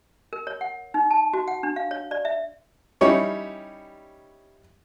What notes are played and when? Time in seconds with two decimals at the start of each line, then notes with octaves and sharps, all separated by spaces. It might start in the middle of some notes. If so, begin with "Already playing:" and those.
0.33 A#4
0.47 C#5
0.61 F#5
0.94 D#4
1.11 A5
1.33 F#4
1.48 F#5
1.63 D4
1.76 F5
1.91 C#5
2.11 D5
2.25 E5
3.01 G3 C#4 D#4 E4 C#5